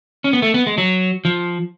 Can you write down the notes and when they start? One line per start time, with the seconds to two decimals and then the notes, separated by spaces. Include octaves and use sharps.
0.24 C#4
0.33 B3
0.42 A3
0.54 B3
0.67 G#3
0.78 F#3
1.25 F3